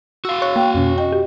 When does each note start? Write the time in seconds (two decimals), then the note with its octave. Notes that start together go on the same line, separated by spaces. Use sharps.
0.25 F#4 F5 E6
0.42 C#5 C#6 F#6
0.56 A#3 G5
0.74 F2 B2 C#4
0.98 D#5 G5
1.12 G4